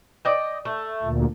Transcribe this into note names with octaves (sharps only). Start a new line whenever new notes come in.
D5 D#5 G5
A3
D2 A#2